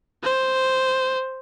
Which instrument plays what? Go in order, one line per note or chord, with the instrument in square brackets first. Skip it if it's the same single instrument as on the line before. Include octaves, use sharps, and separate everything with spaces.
[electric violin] C5